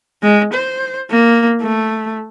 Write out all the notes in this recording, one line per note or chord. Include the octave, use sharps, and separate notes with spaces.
G#3
C5
A#3
A3